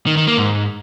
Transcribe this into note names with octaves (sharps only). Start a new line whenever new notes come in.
D#3
D#3
A#3
G#2